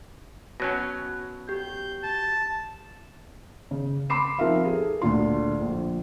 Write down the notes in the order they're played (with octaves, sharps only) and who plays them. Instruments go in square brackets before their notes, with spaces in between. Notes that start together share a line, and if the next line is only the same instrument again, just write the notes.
[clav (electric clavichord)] B2 F#3 C#4 [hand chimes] F#6 A#6
[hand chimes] G4 [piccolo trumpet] G6
[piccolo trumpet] A5
[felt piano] C#3
B5 C6 D6 C7 E7
F3 C4 D#4 A#4 E5 F5
G#4 A4
D2 A#2 D3 F4 C6
A#1